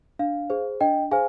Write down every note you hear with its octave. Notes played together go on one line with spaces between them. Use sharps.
D4 F5
G#4 C5
D4 D#5 G5
G#4 C5 F5 G#5